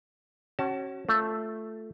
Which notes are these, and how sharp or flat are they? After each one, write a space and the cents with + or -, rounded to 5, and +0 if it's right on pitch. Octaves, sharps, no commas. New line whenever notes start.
C#4 -25 F#4 +30 A5 +0
A3 +0 F4 +0